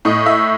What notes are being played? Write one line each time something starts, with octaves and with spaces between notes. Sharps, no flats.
A2 D#5
E5